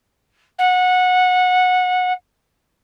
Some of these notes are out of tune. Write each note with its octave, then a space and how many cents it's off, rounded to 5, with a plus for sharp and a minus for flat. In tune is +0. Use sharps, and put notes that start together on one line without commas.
F#5 -20